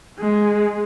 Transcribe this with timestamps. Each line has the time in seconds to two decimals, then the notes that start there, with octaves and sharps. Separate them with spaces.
0.19 G#3